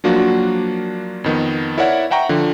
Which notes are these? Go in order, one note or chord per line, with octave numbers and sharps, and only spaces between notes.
F3 F#3 A#3 D4 F4 F#4
F2 D#3 B3
E4 A#4 C#5 D5 E5 F#5
E5 F#5 G5 A#5 C#6
D3 F3